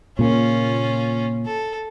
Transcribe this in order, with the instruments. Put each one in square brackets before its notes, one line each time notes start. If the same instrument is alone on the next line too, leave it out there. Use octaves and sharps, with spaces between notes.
[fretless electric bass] A#2 C#3 A#3 [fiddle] C#4 F4
[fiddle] A4